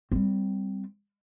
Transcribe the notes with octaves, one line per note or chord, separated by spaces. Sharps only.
G3 C4